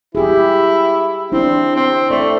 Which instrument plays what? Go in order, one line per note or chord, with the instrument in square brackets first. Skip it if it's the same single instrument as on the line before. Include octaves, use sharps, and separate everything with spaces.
[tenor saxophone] E4 [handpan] G4 G#4
[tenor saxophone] C4 [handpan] D4 E4
[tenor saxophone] C4
[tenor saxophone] A3 [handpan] D5